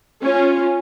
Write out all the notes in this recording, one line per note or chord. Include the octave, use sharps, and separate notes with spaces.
C#4 F4